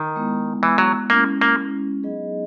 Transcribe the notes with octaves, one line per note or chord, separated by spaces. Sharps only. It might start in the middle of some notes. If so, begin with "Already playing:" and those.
Already playing: D#3
G#3 B3 E4
E3
F#3
G#3 A#3 C#4 E4
A#3
F#3 B3 D#4 G#4 D#5